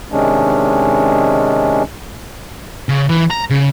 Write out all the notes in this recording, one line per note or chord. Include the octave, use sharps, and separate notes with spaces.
C3 D#3 G#3 C#4 D4
C#3
E3
A#5
C#3